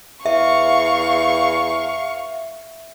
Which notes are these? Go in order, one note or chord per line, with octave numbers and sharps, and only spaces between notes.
E2 E5 F5 C#6